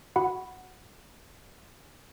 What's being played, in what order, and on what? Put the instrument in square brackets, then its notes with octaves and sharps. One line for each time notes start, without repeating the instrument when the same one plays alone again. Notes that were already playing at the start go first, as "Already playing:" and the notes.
[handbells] F#4 F#5 B5